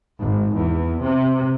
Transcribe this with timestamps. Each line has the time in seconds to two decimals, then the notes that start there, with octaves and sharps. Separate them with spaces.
0.20 G#1
0.55 E2
1.01 C3